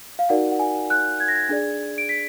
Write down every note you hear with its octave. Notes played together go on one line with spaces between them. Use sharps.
F5
D#4 F#4 A#4 D5 F#5
F#5
G#5
F#6
G#6
A#6
G#6
D4 G#4 D5
D7
B6